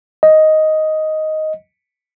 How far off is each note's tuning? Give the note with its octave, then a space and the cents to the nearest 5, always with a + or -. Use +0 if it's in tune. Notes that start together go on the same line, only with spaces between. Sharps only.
D#5 +5